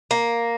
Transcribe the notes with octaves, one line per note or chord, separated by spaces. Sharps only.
A#3